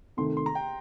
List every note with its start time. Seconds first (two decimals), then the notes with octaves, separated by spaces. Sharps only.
0.17 C3 D#3 A3 C6
0.37 C6
0.46 A#5
0.55 G5